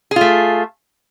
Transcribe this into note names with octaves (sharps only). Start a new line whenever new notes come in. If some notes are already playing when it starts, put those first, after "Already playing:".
A3 F4 G#4